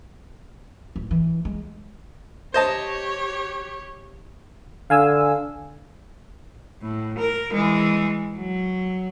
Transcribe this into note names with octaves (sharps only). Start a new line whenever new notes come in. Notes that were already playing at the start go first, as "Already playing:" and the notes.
D1
E3
G#3
G4 C5 C#5 D#5 A5
D3 F5 G#5 E6
A2
A#4
E3 G#3
F#3